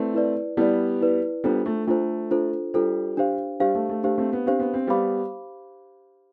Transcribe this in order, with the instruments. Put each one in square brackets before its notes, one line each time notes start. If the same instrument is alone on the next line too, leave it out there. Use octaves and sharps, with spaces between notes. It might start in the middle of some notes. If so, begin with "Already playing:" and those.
Already playing: [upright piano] A3 C4 [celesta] E4 B4 D5
[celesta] E4 B4 D5
[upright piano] G3 B3 [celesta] E4 B4 D5
[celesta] E4 B4 D5
[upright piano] G3 B3 [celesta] D4 F4 A4 C5
[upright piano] A3
[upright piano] A3 [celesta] D4 F4 A4 C5
[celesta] D4 F4 A4 C5
[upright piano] G3 [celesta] D4 F4 A4 C5
[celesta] D4 G4 C5 F5
[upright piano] G3 [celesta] D4 G4 C5 F5
[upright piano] A3
A3
[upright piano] A3 [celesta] D4 G4 C5 F5
[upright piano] A3 C4
B3
[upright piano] C4 [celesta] D4 G4 C5 F5
[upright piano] B3
C4
[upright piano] G3 B3 [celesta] G4 C5 F5 B5 D6